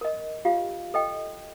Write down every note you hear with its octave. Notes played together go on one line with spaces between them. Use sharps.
A#4 D#5
F4 G4 F5
A4 D#5 G5